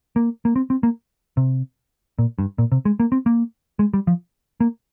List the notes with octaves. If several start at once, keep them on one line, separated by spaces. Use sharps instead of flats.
A#3
A#3
C4
C4
A#3
C3
A#2
G2
A#2
C3
G#3
A#3
C4
A#3
G#3
G3
F3
A#3